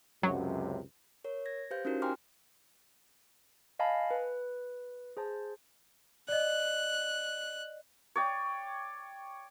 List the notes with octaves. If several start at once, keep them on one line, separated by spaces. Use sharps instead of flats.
C#2 F#2 C3 F#3
A#4 C#5
G#6 A#6
G4 B4 C5 F5 G6
C#4 D#4 E4 F#4 G4 A#4
G5 G#5 A#5 C6 D6 F6
D#5 F5 G#5 A5 B5
B4
G#4 C5 A5
D5 D#5 F#6
C#5 D5 G5